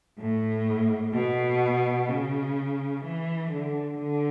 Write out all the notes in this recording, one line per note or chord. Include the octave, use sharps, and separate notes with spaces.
A2
B2
C#3
E3
D3
D3